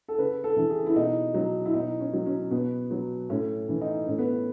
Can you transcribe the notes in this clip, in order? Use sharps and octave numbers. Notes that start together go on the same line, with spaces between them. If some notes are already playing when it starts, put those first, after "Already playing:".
A4
C#3 B4
A4
E3
G#4
E4
B2 D#4
F#3
E4
B2 D#4
C#4
F#3
C#4
B2 B3
F#3
A2 C#4
E3
D#4
A2 C#4
B3